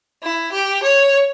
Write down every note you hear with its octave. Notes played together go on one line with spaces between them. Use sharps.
E4
G4
C#5